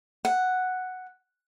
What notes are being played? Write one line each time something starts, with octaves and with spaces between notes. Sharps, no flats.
F#5